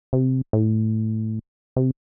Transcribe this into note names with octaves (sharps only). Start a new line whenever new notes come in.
C3
A2
C3